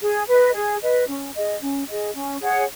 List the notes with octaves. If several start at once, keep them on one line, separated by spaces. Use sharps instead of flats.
G#4
B4 D#5
G#4
B4 D#5
C#4
G#4 D#5
C#4
G#4 D#5
C#4
G#4 C#5 F#5